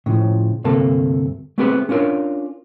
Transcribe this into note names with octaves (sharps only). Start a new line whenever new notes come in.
A2 C#3 F3
D2 G2 C3 A#3 A4 A5
A3 B3 C4 G4 G#4 B4
C#4 D4 F4 A#4 C#5